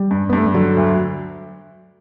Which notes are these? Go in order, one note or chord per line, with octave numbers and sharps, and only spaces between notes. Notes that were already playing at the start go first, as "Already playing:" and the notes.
Already playing: G3
G2
B3
G2 A3
G3
D3 F#3
D2